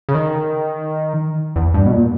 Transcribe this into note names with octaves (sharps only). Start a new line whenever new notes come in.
C#3
D#3
E2
G2
B2
A#2